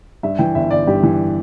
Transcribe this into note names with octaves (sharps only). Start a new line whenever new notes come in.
G2 E5
E3 G5
G1 E5
G1 D5
G2 G4
E3